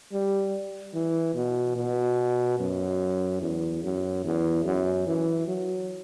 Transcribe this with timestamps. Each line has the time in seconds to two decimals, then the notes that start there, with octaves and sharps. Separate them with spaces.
0.12 G3
0.94 E3
1.35 B2
1.76 B2
2.59 F#2
3.41 E2
3.83 F#2
4.24 E2
4.65 F#2
5.07 E3
5.48 F#3